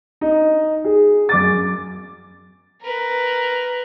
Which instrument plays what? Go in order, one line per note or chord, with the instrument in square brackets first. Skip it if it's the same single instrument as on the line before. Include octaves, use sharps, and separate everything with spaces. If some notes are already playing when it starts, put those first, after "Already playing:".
[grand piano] D#4
G#4
F#2 D6 A6
[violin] A#4 B4